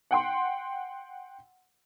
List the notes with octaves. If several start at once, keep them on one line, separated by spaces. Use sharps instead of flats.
F#5 G5 C6